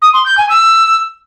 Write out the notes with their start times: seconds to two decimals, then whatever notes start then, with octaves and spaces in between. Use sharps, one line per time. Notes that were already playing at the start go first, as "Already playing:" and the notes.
0.01 D#6
0.13 C6
0.25 G6
0.37 G#5
0.49 E6